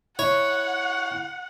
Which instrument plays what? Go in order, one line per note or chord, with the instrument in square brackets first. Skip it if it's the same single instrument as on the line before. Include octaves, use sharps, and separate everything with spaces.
[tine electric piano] E4 [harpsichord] C#5 [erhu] F#5